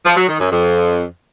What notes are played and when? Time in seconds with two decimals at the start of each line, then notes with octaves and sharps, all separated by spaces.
0.05 F3
0.16 F#3
0.28 D#3
0.40 F#2
0.51 F2